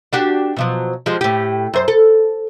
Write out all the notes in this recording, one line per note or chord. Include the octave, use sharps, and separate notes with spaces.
D4 F#4 G4
B2 F3 F#3
F3 G3 G#3
A2 G4
F#2 C5
A4